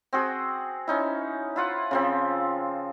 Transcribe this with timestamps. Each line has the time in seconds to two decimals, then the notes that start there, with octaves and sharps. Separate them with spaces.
0.13 C4 F#4 G#4
0.88 C#4 D#4 E4
1.56 E4 F4 F#5
1.91 C#3 F3 C4